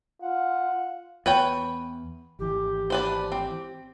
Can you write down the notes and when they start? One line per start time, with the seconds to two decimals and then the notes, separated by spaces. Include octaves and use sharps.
0.22 F4 F#5
1.26 E2 B4 C#5 G5
2.39 G#1 E3 G4
2.90 D4 B4 C5
3.32 C4